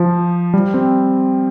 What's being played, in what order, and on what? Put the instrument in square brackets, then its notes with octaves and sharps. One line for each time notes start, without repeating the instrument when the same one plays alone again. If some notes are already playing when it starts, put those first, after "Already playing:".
Already playing: [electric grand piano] F3
G3
C4